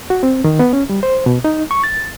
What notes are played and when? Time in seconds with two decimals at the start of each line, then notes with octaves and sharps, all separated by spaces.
0.10 F#4
0.23 C4
0.44 D#3
0.59 B3
0.73 C#4
0.89 G3
1.03 C5
1.26 B2
1.44 D#4
1.71 C#6
1.84 A6